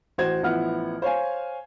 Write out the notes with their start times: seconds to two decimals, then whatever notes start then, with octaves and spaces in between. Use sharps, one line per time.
0.18 A1 F#4 C5 G#6
0.43 A1 F3 B3 E4 F#5 F6
1.02 C5 C#5 F5 G#5